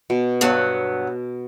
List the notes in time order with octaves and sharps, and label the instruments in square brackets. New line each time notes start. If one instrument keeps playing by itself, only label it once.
[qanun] B2
[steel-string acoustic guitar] G2 F#3 B3